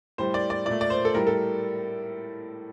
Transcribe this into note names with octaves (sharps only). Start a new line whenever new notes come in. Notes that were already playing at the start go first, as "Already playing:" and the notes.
A2 G3 C5
D5
D5
A#2 A3 D5
D5
C5
A4
A2 G3 A#4
A4